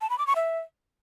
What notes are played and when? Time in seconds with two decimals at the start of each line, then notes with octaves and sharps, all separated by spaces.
0.01 A5
0.10 B5
0.18 D6
0.27 C#6
0.36 E5